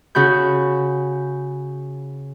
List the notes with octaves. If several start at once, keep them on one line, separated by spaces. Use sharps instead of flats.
C#3 F#4 B5 G6